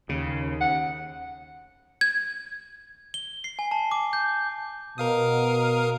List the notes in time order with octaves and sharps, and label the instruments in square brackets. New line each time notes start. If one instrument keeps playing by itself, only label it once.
[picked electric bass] D#2 [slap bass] C#3
[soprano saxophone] F#5
[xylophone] G#6
[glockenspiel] G7
C7
G#5
A5
D6
G6
[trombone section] B2 [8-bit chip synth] A#4 F5 D#6